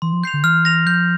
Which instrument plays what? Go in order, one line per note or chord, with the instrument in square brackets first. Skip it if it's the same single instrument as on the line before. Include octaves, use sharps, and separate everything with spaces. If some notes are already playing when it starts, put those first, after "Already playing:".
[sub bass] E3 [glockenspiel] C6
[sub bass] F3
[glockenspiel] G6 C7 F7
[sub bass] D3
[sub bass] E3 [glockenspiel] F6
[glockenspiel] A#6 F7
[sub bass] F3 [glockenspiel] G6